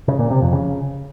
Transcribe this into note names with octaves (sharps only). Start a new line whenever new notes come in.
C#3
A#2
C3
F2
C#3